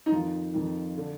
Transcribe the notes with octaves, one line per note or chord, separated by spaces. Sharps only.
D#4
F2 D#3 F4
F2 D#3
D3